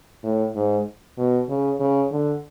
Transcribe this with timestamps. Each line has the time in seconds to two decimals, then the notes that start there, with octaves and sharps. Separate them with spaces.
0.23 A2
0.55 G#2
1.18 B2
1.49 C#3
1.80 C#3
2.12 D3